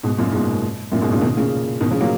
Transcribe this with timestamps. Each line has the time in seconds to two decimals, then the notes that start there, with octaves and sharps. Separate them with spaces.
0.03 G#2 B2
0.18 F#2 A#2
0.32 G#2 B2
0.92 F#2 A#2
1.02 G#2 B2
1.12 A#2 C#3
1.21 B2 D#3
1.37 A#2 C#3
1.81 B2 D#3
1.91 C#3 F3
2.01 F#3 A#3